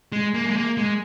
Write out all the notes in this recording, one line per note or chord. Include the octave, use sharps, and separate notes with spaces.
G#3
A#3
G#3
A#3
G#3